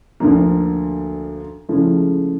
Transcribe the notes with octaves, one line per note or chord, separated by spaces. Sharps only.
D2 D3 F3 A#3
C#2 C#3 F3 A3 E4